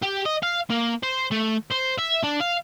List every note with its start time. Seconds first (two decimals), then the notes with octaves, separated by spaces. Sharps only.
0.03 G4
0.26 D#5
0.43 F5
0.70 A#3
1.03 C5
1.31 A3
1.71 C5
1.98 E5
2.23 D4
2.41 F5